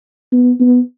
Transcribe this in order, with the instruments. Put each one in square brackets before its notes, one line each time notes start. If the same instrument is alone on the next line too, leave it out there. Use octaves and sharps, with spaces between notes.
[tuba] B3
B3